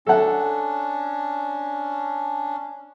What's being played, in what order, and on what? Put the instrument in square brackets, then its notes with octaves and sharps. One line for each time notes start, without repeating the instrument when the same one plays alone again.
[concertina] C#4 D4 [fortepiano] A4 F#5